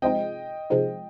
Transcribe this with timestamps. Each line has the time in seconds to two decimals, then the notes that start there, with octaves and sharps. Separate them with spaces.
0.02 C3 F3 G#3 C4 D#4 D#5 G5
0.70 C3 F3 G#3 C4 D#4